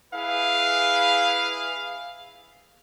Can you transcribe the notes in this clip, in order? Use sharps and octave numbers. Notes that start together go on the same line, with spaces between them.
E4 G#4 B4 F5